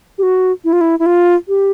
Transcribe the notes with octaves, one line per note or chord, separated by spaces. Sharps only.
G4
F#4
E4
F4
E4
E4
F4
G4